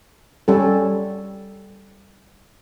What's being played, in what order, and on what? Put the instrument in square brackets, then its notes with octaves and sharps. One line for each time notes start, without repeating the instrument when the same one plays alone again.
[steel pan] G3 C#4 A4